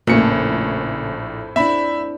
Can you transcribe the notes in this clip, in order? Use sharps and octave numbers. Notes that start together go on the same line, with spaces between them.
A#1 F2 A2 C#3 A#3 A#4 C#7
C4 D4 E4 E5 B5